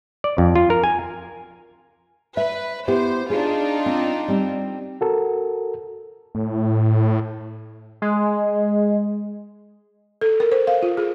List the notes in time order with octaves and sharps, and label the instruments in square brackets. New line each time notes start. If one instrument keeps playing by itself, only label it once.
[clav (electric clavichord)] D5
F2
F4
A#4
G#5
[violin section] B4 [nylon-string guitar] E5
[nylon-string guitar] B3 E4 G4 [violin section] C5
[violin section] D4 D#4 F4 [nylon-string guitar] G#4
[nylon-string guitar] C4
G3 C4
[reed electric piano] F#4 A4 A#4
[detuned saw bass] A2
[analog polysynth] G#3
[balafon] A4
A#4
C5
F5
F4
G#4